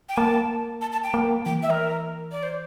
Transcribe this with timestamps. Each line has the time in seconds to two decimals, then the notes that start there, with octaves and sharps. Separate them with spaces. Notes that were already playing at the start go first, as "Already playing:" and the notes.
0.09 G5
0.17 A#3 A5
0.81 A5
0.92 A5
1.03 G5
1.14 A#3
1.45 E3 G5
1.63 E5
1.70 A#4
2.32 D5
2.43 C5